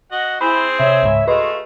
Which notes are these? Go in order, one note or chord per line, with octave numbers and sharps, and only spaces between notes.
F#4 D#5 F#5
C4 E4 G#4 C5 B5
C3 C#5 E5
C#2 G#2
A3 F#4 G#4 B4 D#5 F5 C6